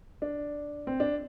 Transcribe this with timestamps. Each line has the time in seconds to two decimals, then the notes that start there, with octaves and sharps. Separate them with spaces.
0.22 D4
0.87 C4
1.00 D4